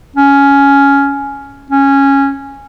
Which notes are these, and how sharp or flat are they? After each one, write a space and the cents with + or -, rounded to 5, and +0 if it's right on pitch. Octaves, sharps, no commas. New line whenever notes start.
C#4 +10
C#4 -10